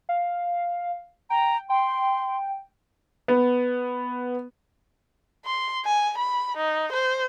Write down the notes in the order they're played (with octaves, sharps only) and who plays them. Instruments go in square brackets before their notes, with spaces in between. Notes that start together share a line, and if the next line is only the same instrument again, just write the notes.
[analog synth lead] F5
[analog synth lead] G5 [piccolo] A#5
[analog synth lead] G5 [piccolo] C6
[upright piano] B3
[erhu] C6
G#5
B5
D#4
C5